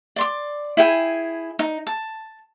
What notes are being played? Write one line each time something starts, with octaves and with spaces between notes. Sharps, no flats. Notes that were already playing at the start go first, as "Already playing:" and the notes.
D5 C6 D6
E4 G#4 G5 G#5
D#4
A5